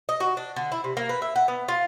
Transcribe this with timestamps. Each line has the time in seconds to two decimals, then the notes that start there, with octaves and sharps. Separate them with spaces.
0.09 D#5
0.20 F#4
0.37 D4
0.56 D3
0.72 E4
0.84 C3
0.97 A#3
1.09 B4
1.22 E5
1.36 F#5
1.48 B3
1.68 F4